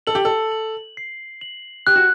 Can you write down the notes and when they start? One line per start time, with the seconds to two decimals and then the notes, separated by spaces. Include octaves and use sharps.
0.07 A4 F#7
0.15 G4
0.25 A4
0.52 F#7
0.97 C7
1.41 F#7
1.87 G4 F#6
1.96 F#4